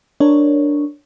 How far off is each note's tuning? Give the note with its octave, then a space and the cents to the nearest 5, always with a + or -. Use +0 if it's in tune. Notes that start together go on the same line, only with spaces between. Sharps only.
D4 +0 A#4 +0 C#5 +0